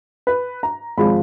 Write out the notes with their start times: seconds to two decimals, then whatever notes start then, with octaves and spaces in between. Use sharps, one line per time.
0.27 B4
0.63 A#5
0.97 G#1 F3 G#3 B5